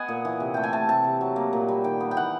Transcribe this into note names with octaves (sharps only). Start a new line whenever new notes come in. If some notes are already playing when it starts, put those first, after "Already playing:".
Already playing: B3 D#5 F#5 G#5
A#2
E3
C3
A3 G5
G#5
A3 A5
C3 A5
C3
F#3
A#3
A#2
G3
D#3 G5
B3
G5
E3 F#5